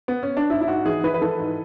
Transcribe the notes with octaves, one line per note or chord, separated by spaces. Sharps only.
B3
C#4
D4
G#2 E4
E4
G#2 F#4
E3 G#4
E3 B4
B4
E3 A4
G#2